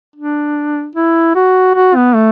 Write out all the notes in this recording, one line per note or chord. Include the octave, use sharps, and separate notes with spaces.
D4
E4
F#4
F#4
B3
A3